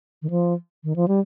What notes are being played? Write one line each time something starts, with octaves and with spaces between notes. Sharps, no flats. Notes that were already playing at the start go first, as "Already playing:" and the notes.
D#3
F3
D#3
F3
G3